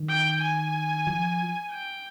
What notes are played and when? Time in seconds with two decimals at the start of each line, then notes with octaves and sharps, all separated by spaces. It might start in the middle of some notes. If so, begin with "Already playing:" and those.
Already playing: D#3
0.09 G5
0.41 G#5
1.07 F3
1.71 G5